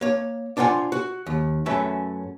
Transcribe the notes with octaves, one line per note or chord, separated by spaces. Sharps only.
A#3 C#5
D4 F4 C5 F#5 G#5
F#4
D#2
F#2 A3 C#4 B4 E5